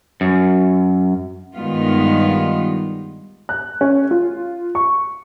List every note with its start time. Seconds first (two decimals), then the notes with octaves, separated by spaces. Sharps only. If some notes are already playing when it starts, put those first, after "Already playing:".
0.21 F#2
1.56 G2 D#3 G#3 B3 F4
3.49 F#6
3.81 C#4
4.11 F4
4.75 C#6